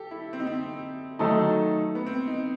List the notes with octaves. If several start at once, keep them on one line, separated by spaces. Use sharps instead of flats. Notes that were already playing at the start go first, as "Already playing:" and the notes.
Already playing: G4 A4
E4
C4
D#4
C4
D#3 F#3 A3 D#4 A4
B3
C4
D#4